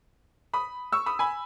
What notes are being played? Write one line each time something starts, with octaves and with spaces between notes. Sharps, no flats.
B5 D#6
C#6 E6
B5 D#6
G#5 B5